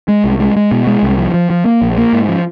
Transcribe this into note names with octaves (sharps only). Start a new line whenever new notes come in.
G#3
C2
G#3
G#3
B2
G#3
C2
F3
F3
F3
A#3
A#1
A#3
G#2
F3